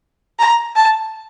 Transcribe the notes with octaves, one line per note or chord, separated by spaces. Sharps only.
A#5
A5